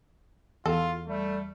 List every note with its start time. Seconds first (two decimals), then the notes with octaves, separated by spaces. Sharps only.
0.66 E2 F4 A4
1.08 G3 A3